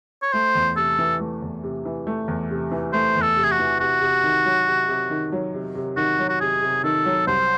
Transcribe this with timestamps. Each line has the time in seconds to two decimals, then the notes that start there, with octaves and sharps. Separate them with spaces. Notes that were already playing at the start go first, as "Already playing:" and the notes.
0.22 C#5
0.33 A3 C5
0.55 E2
0.76 C3 A4
0.99 E3
1.20 A3
1.42 E2
1.63 C3
1.85 E3
2.07 A3
2.28 E2
2.50 C3
2.72 E3
2.93 A3 C5
3.16 E2
3.22 A4
3.37 C3
3.44 G#4
3.51 F#4
3.59 E3
3.80 C3 F#4
4.01 C3
4.24 D#3
4.45 F#3
4.67 C3
4.88 C3
5.10 D#3
5.32 F#3
5.54 C3
5.75 C3
5.97 D#3 F#4
6.19 F#3
6.29 F#4
6.40 C3 G#4
6.62 C3
6.84 D#3 A4
7.05 F#3
7.27 C2 C5